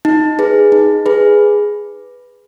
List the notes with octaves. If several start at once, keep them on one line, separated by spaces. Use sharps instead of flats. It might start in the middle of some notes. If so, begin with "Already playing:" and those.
D#4
G#4 B4
D#4
G#4 B4